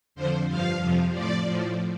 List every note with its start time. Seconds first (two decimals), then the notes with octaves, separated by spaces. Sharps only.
0.15 F2 D3 F3 C5
0.48 G2 F3 F5
0.80 F2 C3 F3
1.12 A2 F3 D5
1.45 A2 F3